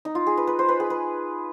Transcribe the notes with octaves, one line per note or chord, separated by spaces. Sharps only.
D#4
F4
G#4
B4
B4
C5
B4
G#4
B4